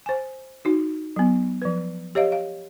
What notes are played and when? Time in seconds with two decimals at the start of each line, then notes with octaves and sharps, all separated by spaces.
0.06 C5 G#5
0.65 D#4 F#4
1.16 F#3 B3
1.62 F3 B4
2.15 G4 C#5 D#5 F5
2.32 F5